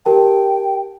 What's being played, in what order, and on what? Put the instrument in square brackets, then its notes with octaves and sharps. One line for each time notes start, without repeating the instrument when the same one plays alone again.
[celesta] G4 A#4 A5 [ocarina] G5